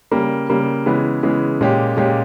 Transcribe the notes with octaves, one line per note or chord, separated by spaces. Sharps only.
C#3 G3 A#3
C#3 G3 A#3
C#3 E3 G#3 B3
C#3 E3 G#3 B3
A#2 G#3 C#4 G4
A#2 G#3 C#4 G4